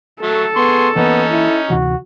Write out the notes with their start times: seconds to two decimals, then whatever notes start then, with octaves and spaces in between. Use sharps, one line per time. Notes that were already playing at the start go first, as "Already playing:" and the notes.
0.22 F#3 A3 A4
0.56 B3 G#4 C6 C#6
0.96 E3 A#3 B3 C#4 D#4
1.31 E4
1.70 D2 C3 E3 F#4